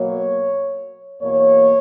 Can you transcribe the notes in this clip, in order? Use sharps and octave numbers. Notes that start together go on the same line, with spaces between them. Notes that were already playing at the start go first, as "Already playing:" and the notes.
Already playing: B2 F#3 A#3 C#5
E2 B2 A#3 C#5